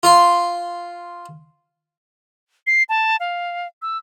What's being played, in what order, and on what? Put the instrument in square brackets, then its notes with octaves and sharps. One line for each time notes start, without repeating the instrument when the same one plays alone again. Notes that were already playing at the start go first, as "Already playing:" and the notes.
[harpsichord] F4 C6
[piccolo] C7
A5
F5
E6